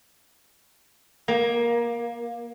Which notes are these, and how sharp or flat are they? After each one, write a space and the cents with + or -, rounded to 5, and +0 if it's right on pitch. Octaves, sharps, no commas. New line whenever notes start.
A#3 +20